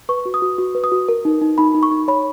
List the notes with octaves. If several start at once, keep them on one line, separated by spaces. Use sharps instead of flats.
B4 C#6
F#4
D#6
F#4
F#4
B4
D#6
F#4
A#4
D#4
D#4
D#4 B5
D#4
C#6
D#4
C#5 B5